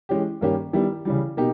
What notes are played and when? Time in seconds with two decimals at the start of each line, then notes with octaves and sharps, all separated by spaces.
0.09 E3 G#3 C#4 G4
0.41 G2 D#3 A#3 C#4 G4
0.73 D#3 G3 B3 E4 G4
1.05 C#3 E3 G3
1.37 B2 A#3 D#4 G4